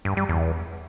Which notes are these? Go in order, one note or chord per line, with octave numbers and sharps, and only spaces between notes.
G2
G3
E2